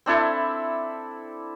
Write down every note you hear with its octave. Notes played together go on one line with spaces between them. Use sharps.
C4 D4 E4 A4